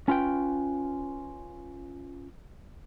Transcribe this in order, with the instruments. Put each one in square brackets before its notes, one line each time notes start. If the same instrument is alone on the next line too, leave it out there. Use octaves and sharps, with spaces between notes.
[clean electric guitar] C#4 F4 B4 G5